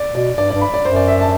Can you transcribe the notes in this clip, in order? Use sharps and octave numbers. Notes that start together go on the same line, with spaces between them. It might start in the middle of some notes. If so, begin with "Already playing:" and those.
Already playing: D5
B2 D5
G2 D5
D5
G2
B5
D5
F#2 C5
D5
E5
A5